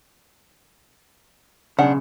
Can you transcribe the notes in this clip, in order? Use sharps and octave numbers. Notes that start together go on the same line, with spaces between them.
B1 C#3 D4 F#5